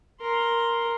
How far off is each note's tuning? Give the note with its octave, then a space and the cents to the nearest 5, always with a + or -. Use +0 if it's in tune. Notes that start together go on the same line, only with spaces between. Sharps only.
A#4 +0 C6 +5